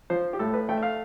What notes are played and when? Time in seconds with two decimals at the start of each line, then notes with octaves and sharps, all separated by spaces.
0.10 F3 C5
0.33 G4
0.39 A2 A4
0.54 B4
0.69 A3 G5
0.77 E5
0.83 F5